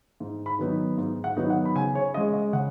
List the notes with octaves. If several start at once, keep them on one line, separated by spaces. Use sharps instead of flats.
G#2
B5
D#3 F#3 B3 D#4
G#2
F#5
D#3 F#3 B3 D#4
F#5
B5
C#3 G#5
C#5
G#3 C#4 D#5
D#5
C#3 F#5